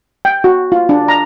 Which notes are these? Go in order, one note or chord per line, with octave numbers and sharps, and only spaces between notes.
G5
F#4
F4
D4
A#5